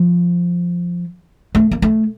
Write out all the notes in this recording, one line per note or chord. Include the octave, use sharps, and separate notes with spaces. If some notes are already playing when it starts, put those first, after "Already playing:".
Already playing: F3
A3
A#3
A3